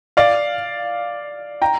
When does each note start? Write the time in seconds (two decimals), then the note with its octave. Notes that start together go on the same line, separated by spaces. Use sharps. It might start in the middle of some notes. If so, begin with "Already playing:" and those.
0.17 D5 F5
1.62 G5 A#5